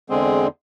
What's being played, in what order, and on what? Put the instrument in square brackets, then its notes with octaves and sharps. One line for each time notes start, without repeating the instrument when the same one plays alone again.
[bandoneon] E2 D3 G#3 C4 G#4